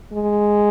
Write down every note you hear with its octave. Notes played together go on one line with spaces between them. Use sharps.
G#3